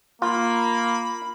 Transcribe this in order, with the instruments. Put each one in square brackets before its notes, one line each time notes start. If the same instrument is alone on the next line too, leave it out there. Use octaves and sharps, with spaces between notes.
[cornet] A#3 [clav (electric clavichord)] F4 [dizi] B5